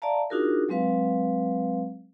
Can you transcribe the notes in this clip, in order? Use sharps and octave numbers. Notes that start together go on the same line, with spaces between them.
D5 E5 F5 A5 A#5
D4 D#4 F4 F#4 G#4 A#4
F#3 G#3 C4 B4 F5